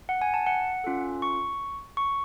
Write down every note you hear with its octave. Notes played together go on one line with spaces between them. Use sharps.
F#5
G#5
A5
F#5
C#4 F4 A4
C#6
C#6